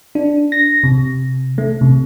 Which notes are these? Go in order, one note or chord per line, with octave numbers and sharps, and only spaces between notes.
D4
A#6
C3
A3
C3